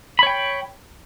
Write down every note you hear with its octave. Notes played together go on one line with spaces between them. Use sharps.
C#5 G5 B5